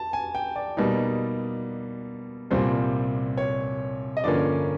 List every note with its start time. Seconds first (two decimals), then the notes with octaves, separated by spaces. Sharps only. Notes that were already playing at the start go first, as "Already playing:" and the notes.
Already playing: A5
0.13 G#5
0.35 G5
0.56 D5
0.77 B2 G3 A#3 D#4
2.51 C2 A#2 G3 C4 C5
3.37 C#5
4.17 D#5
4.24 G2 D3 F3 A#3 C#4 D5